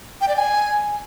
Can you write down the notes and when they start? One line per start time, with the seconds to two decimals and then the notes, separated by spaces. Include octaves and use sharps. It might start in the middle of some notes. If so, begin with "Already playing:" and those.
0.21 G5
0.29 D5
0.36 G#5